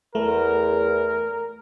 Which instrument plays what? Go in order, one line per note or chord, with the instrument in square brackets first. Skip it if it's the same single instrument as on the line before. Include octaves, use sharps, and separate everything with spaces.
[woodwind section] E2 [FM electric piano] A3 [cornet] A#4